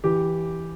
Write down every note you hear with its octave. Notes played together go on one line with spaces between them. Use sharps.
E3 G4